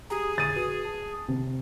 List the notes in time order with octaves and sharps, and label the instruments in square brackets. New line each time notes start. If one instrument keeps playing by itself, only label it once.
[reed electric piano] G4 G#5 A#5 [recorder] G#4
[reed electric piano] E2 A#2 D3 [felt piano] A6 D#7
[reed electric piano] F#4 B4
A5
[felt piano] C3